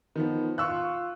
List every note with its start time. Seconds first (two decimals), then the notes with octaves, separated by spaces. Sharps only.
0.16 D#3 F3 B3
0.58 F4 C#6 E6 F#6